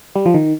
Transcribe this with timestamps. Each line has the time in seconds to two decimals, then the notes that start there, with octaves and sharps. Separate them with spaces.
0.16 G3
0.26 F3
0.34 D#3